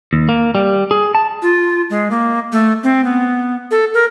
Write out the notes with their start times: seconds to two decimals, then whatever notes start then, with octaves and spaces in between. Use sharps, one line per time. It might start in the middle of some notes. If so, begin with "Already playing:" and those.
0.13 D#2
0.29 A#3
0.55 G3
0.91 G#4
1.15 A5
1.42 F4
1.90 G#3
2.11 A#3
2.52 A3
2.83 C4
3.04 B3
3.71 A4
3.94 A#4